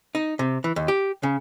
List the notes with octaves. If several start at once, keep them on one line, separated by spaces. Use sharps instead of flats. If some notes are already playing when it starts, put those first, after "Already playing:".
D#4
C3
E3
D#2
G4
C#3